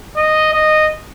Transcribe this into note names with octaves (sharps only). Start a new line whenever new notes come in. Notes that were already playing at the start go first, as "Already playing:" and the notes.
D#5
D#5